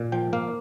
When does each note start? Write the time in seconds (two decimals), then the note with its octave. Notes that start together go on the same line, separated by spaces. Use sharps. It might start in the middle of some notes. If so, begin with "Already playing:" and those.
Already playing: A#2
0.12 F3 G5
0.33 A#3 F5